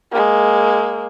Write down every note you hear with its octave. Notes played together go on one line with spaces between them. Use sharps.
G#3 A#3